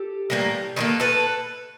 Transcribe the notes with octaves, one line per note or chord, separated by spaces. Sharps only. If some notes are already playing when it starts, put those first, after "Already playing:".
Already playing: G4 A4
A2 E3 G3 A#3
D#3 G3 A#3 A4 B4
A4 B4